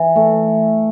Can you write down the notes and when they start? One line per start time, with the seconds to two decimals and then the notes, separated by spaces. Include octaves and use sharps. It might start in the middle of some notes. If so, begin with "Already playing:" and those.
Already playing: E3
0.16 A3